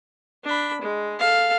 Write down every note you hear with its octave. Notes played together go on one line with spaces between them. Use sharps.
D4 B5
G#3
A4 F5